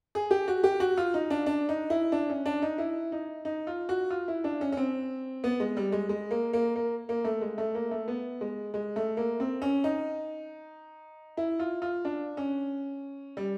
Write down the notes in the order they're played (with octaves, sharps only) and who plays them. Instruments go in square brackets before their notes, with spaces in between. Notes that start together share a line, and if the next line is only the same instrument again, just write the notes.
[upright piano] G#4
G4
F#4
G4
F#4
F4
D#4
D4
D4
D#4
E4
D4
C#4
D4
D#4
E4
D#4
D#4
F4
F#4
F4
E4
D4
C#4
C#4
C4
B3
G#3
G3
G#3
G#3
A#3
A#3
A#3
A#3
A3
G#3
A3
A#3
A3
B3
G#3
G#3
A3
A#3
C4
C#4
D#4
E4
F4
F4
D4
C#4
G3